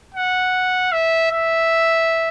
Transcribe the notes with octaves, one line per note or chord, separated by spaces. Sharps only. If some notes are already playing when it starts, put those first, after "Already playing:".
F#5
E5
E5